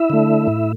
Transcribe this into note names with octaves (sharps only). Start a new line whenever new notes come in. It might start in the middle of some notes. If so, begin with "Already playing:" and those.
Already playing: E4 E5
D3 A3
A2